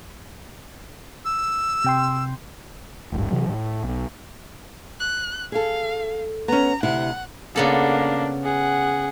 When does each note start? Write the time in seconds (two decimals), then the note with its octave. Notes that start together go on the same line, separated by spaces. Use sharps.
1.25 E6
1.84 C3 G5 C6
3.12 D1 G#1 G2
3.31 C3 E3 F#3
3.49 A2
3.83 B1
5.00 F#6
5.52 G#4 A4 F5
6.48 B3 C#4 A#5
6.83 D2 C3 E4 F#5
7.56 C#3 A#3 B3 D4 A4
8.44 G#4 F#5